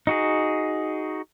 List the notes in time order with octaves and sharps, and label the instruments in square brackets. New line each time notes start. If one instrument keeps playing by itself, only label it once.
[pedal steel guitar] D#4 F#4 G#4